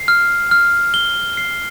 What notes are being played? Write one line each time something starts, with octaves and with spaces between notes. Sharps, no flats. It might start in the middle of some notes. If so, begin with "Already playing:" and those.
Already playing: C7
F6
F6
G7
C7